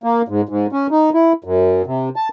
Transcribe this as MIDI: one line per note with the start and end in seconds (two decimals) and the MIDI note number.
0.04 0.22 58
0.28 0.41 44
0.49 0.67 44
0.72 0.87 61
0.91 1.10 63
1.14 1.33 64
1.44 1.82 42
1.86 2.09 48
2.16 2.29 81